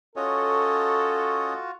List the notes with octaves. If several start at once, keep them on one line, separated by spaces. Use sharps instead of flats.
C#4 F4 F#4 A4 C#5 D#5